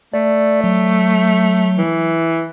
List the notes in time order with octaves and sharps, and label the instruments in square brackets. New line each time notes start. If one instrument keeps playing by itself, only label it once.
[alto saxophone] A3 [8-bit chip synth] D5
[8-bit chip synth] F#3
[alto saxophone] E3